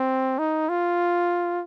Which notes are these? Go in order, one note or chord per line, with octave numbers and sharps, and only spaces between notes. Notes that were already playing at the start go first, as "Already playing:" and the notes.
Already playing: C4
D#4
F4